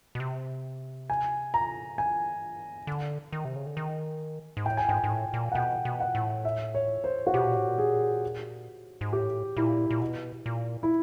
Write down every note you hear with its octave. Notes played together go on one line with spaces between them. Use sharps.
B2
C3
G#5
A#5
G#5
D3
D#3
C3
C#3
D3
D#3
G#2
A2 G5
G#5
G#2 G5
G#2
A2
A#2
F#5
B2 G5
B2
F#5
A2
E5
C#5
C5
F#4
B2 G4
A#2
A2
A#2
G#4
G#2
A2 G4
A#2 E4
A#2
B2
A#2
E4